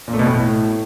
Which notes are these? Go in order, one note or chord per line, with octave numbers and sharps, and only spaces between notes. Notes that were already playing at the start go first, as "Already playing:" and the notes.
A#2
A3
B2
A2